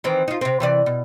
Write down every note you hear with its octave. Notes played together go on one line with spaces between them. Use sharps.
D#3 E3 C4
D#4 F4
C3 C4
C3 E3 D5
B2